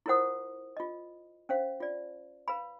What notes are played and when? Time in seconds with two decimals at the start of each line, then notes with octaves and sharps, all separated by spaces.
0.06 E4 F4 A#4 C5 F#5 D#6
0.77 F4 D#5
1.49 C#4 C5 F5
1.80 F4 D5
2.48 B4 F5 B5